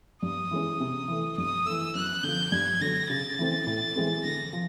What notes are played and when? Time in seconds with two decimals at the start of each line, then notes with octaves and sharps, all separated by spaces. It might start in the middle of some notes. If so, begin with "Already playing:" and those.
0.22 G2 D#6
0.51 E3 G#3 C#4
0.80 C3
1.08 E3 A3
1.37 G2 D#6
1.65 E3 A3 E6
1.95 F#2 F#6
2.23 D3 F3 G6
2.52 G2 G#6
2.81 D3 F#3 A#6
3.09 C#3 A6
3.39 E3 A3 C4
3.67 A2
3.96 E3 G#3 C4
4.24 D3 A#6
4.53 F3